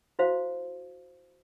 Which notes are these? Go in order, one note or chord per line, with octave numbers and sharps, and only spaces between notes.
E4 F#4 C5 F5